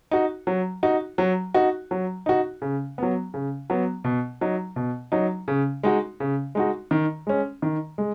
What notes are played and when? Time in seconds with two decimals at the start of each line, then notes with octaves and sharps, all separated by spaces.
0.11 D#4 F#4
0.47 F#3
0.83 D#4 F#4
1.18 F#3
1.55 D#4 F#4
1.91 F#3
2.26 D#4 F#4
2.62 C#3
2.98 F#3 B3
3.34 C#3
3.70 F#3 B3
4.04 B2
4.41 F#3 D#4
4.76 B2
5.12 F#3 D#4
5.48 C#3
5.83 G#3 D#4 F#4
6.20 C#3
6.55 G#3 D#4 F#4
6.91 D#3
7.27 G#3 C#4
7.62 D#3
7.98 G#3